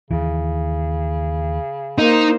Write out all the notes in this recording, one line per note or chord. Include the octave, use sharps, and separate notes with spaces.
D#2 C#3 E3
A#3 D#4 C5